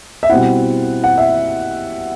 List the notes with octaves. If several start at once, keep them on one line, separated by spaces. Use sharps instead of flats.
E5
B2 G3 C4 E4 F#5
F#5
E5